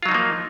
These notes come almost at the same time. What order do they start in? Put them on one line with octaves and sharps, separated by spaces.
F4 F#3 D#4 F3 A#3